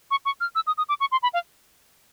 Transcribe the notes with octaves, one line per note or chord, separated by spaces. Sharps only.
C#6
C#6
F6
E6
D#6
D#6
D6
C#6
C6
B5
F5